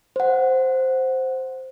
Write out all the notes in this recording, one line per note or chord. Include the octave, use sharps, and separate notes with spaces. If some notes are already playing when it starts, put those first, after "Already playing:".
C5 F#5